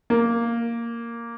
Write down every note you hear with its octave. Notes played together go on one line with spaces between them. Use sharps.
A#3